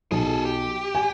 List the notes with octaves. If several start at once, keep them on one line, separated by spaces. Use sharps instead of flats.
B1 G#4 A4
G4
G#5